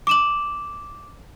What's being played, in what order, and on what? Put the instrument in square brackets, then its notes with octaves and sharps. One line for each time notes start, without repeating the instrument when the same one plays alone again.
[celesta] D6 E7 F#7